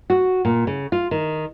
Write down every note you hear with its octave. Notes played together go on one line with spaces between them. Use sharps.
F#4
A#2
C#3
F4
D#3